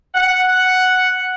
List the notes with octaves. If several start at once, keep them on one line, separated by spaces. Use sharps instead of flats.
F#5